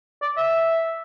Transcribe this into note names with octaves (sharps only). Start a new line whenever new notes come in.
D5
E5